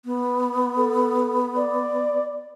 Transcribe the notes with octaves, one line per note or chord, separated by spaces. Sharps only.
B3
A4
D5